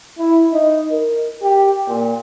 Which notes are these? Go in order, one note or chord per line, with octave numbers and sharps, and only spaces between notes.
E4
D#4
A#4
G4
A#2